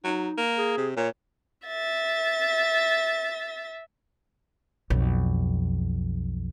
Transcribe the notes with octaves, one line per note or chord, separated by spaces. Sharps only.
F#3 D#4
A#3
G#4
C3
A#2 C#5
E5 A6
B1 F2